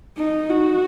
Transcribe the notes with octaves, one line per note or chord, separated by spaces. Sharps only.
D#4
F#4